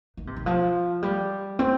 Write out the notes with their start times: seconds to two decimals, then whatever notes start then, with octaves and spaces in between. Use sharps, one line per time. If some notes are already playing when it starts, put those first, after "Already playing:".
0.17 D#3
0.27 C3
0.36 D#3
0.46 F3
1.03 G3
1.59 C4